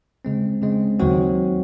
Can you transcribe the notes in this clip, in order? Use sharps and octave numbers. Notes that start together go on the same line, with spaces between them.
C#3 G#3 C4
C#3 G#3 C4
D#2 D#3 F#3 C4 F#4